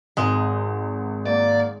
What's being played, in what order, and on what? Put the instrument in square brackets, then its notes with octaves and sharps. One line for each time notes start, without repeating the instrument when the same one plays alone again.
[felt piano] G#1 [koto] G#3
[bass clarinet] A#3 [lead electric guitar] D5